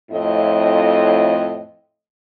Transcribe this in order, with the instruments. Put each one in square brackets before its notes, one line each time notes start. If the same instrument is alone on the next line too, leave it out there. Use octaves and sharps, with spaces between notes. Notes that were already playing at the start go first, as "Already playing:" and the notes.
[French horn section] F2 A2 D#5